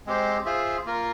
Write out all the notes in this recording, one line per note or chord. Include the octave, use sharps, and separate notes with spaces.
G#3 C4 G4 C5
F4 G#4 C5 E5
A#3 F4 A#4